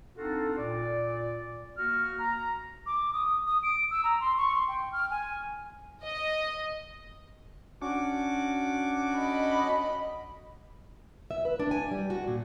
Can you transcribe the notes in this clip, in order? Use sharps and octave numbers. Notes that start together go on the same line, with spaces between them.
C4 D4 D#4 F4 F#4 A4
A#2 D5
A#3 F#4 F6
A#5
D6
D#6
D#6
D7
E6
A#5
C6
C#6
C6
G5
F6
G#5
D#5
C#4 D4 F#4 D6
D#5 B5
E5
B4
D4
G#5
G3
F#4
A#2